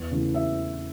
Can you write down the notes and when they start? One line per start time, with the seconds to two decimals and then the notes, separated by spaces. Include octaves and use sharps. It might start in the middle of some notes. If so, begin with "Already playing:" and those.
Already playing: E2
0.11 C#3 E3 A3
0.34 E5